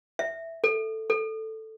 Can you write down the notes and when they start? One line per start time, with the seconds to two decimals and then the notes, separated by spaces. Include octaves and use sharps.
0.19 E5
0.64 A4
1.10 A4